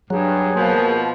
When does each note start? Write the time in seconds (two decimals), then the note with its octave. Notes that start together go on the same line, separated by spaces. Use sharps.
0.10 G2 F#3 G#4
0.56 B2 F3 A#3